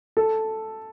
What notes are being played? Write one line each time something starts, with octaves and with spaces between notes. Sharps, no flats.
A4